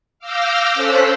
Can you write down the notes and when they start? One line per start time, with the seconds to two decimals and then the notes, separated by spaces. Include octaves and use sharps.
0.19 F5 D6 E6 F6 G6 A#6
0.74 C#4 A4 C5 E6 F#6 B6